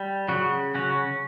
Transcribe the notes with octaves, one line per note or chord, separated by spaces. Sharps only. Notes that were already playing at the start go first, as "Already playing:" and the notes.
Already playing: G3
C#3 F#3 F#4
F#3 C#4 F#4